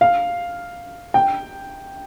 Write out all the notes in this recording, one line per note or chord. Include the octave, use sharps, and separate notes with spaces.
F5
G5